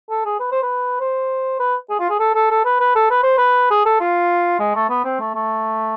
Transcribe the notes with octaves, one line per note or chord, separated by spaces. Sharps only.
A4
G#4
B4
C5
B4
C5
B4
G#4
F4
G#4
A4
A4
A4
B4
B4
A4
B4
C5
B4
G#4
A4
F4
G#3
A3
B3
C4
A3
A3